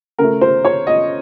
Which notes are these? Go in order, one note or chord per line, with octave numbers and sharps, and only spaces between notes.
C#3 A3 A#4
C5
C#5
D#5